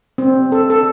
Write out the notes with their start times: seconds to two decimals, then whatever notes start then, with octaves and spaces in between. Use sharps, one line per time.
0.18 C4
0.52 A4
0.70 A4